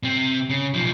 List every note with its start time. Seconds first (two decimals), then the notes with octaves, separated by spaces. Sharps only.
0.03 C3 C4
0.50 C#3
0.74 B1 F3